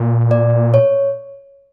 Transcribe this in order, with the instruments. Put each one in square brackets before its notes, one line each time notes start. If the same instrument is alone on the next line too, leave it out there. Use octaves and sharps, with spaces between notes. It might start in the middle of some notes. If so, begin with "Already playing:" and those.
Already playing: [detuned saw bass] A#2
[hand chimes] D5
C#5